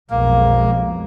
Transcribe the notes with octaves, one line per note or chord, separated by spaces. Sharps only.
B1 F2 G#3 A#3